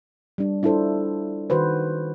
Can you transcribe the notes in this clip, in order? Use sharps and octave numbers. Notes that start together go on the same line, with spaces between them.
G3 D4
D4 E4 F4 A4 C5
D#3 F#4 B4 C5